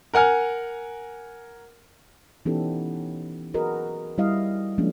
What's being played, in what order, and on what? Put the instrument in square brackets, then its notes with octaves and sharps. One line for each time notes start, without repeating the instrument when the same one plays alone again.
[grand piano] A#4 F#5 G#5 F6
[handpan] E3 B3 C#4 D#4 G4 A4
F#4 G#4 A#4 B4 D#5
G3 E4 D#5 F5
F3 G#3 A#3 C#4 D4